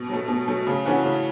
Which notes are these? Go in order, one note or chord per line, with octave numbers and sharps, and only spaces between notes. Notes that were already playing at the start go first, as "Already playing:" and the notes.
Already playing: B2
F#3 A3
B2
F#3 A3
C#3
E3 A3 C#4 F#4
C#3